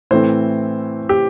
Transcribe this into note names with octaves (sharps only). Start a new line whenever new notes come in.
A2 E3 A3 C4 C5
G4